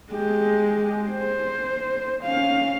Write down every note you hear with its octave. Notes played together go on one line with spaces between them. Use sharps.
G#3 G4
C5
C#4 F5